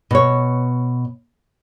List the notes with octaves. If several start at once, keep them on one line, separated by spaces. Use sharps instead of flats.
B2 C#5